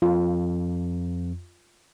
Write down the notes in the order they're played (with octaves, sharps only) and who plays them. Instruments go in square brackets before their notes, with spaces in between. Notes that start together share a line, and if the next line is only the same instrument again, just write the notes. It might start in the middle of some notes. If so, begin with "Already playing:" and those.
[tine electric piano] F2 [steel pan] F4